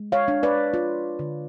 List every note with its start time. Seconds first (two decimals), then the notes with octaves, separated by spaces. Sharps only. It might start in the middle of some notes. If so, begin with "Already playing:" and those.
Already playing: G#3
0.12 C#5 F5
0.28 D4
0.43 B4 D5
0.74 F4
1.19 D3